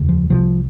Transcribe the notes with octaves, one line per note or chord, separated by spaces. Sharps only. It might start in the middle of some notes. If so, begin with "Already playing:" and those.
Already playing: F1 D#2 C#3
F3
C2 C3 F3